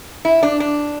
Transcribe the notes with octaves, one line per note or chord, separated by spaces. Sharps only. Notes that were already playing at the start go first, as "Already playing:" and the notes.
E4
D4
D4